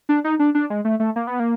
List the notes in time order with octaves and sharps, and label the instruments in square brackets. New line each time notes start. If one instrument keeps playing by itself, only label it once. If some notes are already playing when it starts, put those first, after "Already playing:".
[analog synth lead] D4
D#4
D4
D4
G#3
A3
A3
A#3
B3
A#3